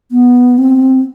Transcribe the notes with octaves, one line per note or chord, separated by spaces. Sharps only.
B3
C4